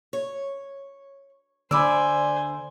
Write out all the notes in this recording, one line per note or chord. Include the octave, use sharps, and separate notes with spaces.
C#5
D2 D3 C5 D5 G#5 B5 D6 E6